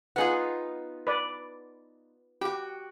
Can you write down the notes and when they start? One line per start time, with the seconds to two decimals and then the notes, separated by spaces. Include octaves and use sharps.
0.16 B3 D#4 F4 G#4 F#5
1.07 B4 D5
2.41 F#4 G4 G5